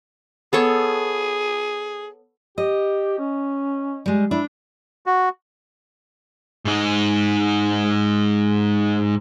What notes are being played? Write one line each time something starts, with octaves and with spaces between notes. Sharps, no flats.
B3 G#4 A4 C#5
G4 D#5
C#4
G3 G#3
D4 E4
F#4
G#2 D#4